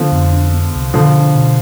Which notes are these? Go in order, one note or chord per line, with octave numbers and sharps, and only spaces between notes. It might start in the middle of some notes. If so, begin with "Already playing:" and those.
Already playing: D3 F3 B3
F2
D4
B3
C2
B2 D3 F3
D4
B2